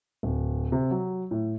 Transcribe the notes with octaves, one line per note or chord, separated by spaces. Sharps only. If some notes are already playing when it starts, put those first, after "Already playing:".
D1
C3
F#3
A2